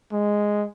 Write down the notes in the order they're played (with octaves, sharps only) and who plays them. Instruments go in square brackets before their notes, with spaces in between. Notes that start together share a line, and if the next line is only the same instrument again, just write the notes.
[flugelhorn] G#3